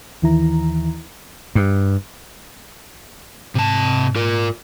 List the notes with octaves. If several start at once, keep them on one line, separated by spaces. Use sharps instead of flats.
D#2 D#3 E3 E4 A#5
G2
G#2 C3 A5
F4 A#4